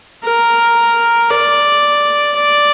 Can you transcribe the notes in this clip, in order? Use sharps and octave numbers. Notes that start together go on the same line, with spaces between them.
A#4
D5
D5